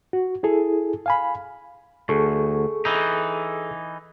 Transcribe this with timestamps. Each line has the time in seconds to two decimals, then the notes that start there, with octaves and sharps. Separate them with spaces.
0.13 F#4
0.43 E4 G#4 A4
1.06 F5 G#5 B5
2.09 D2 G#4 A4 C#6
2.85 E3 D#4